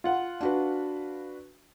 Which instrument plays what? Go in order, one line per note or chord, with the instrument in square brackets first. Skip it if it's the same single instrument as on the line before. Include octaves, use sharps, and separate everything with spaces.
[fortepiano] F4 F#5
[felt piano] D4 F#4 B4